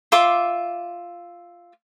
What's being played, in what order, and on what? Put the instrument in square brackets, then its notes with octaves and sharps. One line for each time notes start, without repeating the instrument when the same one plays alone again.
[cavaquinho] F4 E5 C6 D6